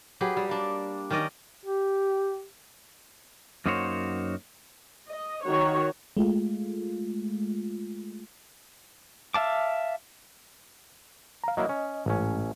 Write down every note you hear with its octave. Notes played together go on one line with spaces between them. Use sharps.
F#3 G4 G#4 B4
G3
A#3 D4
D#3 C#4 D5 D#5
G4
F#2 A#3 D#4 F#4 C5 C#5
D#5
D#3 F#4 C#5
G#3 A3 F4
E5 F5 A5 D6
F5 A#5
F#3 A#3 E4 D#5
C#4
A1 G#2 C#4